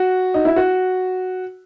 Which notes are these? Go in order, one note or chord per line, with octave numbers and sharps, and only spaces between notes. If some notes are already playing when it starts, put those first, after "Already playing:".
Already playing: F#4
D#4
E4
F#4